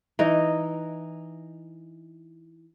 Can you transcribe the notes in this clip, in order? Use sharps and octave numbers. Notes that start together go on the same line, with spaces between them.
E3 D#4 D#5